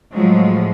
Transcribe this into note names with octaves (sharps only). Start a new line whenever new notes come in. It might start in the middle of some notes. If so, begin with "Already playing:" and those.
A2 F3 F#3 G#3